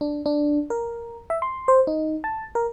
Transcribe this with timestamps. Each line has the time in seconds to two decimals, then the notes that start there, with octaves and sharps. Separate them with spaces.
0.01 D4
0.26 D4
0.70 A#4
1.30 E5
1.42 C6
1.68 C5
1.87 D#4
2.24 A5
2.55 A#4